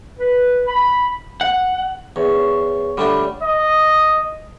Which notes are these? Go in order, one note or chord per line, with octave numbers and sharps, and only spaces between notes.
B4
B5
F#5
E2 C#5
D3 G3 A3 D4
D#5